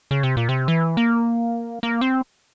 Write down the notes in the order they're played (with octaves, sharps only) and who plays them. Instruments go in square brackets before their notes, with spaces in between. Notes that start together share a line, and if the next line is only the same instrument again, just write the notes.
[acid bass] C#3
C3
A#2
C3
E3
A#3
A#3
C4